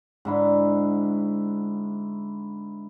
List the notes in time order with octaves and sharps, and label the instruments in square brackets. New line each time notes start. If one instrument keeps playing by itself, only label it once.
[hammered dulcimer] G#2 D3 E4